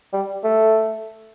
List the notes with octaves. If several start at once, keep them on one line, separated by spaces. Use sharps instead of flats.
G3
A3